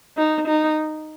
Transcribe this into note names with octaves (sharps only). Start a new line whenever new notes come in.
D#4
D#4